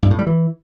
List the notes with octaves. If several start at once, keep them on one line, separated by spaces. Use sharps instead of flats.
G2
A2
G3
E3